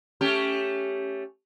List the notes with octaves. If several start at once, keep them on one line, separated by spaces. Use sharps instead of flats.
A3 C#4 G4